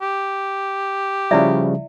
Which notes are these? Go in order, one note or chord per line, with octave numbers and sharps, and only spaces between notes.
G4
C#3 F3 G3 E4 D5 E5